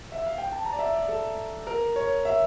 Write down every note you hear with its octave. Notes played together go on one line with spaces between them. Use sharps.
E5
F5
G5
A5
A#5
D5
E5
D5
A4
A#4
C#5
E5